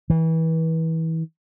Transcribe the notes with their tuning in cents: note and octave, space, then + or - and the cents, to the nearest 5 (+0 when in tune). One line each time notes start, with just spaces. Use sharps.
E3 -30